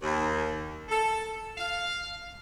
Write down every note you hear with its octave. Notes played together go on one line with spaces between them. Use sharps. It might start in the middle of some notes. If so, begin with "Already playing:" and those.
D#2
A4
F5